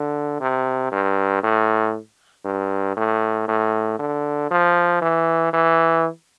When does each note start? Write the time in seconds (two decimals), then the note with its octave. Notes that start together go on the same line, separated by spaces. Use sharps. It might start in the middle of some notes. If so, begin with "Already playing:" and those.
Already playing: D3
0.40 C3
0.92 G2
1.43 A2
2.45 G2
2.97 A2
3.48 A2
3.99 D3
4.51 F3
5.02 E3
5.53 E3